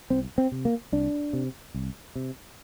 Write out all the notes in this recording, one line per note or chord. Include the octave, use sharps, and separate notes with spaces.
C2 C4
C4
C3
A#3
C2 D4
C3
C2
C3